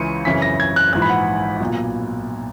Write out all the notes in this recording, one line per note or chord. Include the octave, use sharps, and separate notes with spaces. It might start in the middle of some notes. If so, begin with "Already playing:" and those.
Already playing: C#2 C#3 E3 C#7 D#7
G#1 F#2 C#3 E3 B6
A#6
G#6
F#6
A#1 G#2 E3 F#6
B5
F#5
B1
A#2